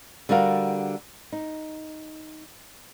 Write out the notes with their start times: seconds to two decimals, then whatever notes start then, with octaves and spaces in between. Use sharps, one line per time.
0.29 D3 G3 F#4 A#4 F5
1.32 D#4